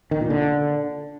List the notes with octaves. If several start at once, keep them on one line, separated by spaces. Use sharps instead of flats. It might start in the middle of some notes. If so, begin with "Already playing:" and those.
D#3
A#2
D3